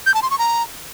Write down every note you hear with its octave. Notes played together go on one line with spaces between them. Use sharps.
G6
A5
C6
C#6
A#5